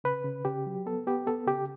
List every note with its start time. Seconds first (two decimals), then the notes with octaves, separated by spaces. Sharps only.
0.04 C#3 B4
0.24 C#3
0.45 C#3 G4
0.66 F#3
0.86 B3 A4
1.07 B3 G4
1.26 B3 A4
1.47 C#3 G4